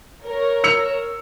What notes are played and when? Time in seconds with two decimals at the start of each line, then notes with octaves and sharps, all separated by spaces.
0.24 A#4 C#5
0.64 E6 C#7 F7